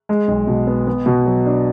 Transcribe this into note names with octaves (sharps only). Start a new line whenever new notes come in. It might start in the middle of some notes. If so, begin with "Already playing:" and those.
G#3
B1
B2
B3
B3
B2
F#3
D4